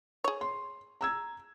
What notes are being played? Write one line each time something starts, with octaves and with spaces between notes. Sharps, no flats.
G#4 C#5
C6
A#5 E6 G#6